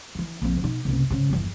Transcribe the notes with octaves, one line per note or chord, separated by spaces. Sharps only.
E3 F3
A#1 F2
B2 D#4
F#1 C2
G#2 C#3
G1 E2